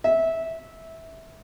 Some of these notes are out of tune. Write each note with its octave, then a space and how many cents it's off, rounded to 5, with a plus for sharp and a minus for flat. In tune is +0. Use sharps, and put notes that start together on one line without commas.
E5 -15